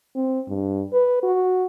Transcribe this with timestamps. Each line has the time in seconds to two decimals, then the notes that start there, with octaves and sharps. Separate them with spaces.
0.16 C4
0.48 G2
0.93 B4
1.23 F#4